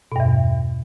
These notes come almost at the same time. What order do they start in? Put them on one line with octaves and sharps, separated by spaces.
B2 G2 E2